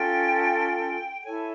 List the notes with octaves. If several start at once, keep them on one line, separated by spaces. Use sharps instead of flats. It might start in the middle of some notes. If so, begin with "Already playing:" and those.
Already playing: C#4 F4 A4 G5
G5
E4 A4 C#5 G#5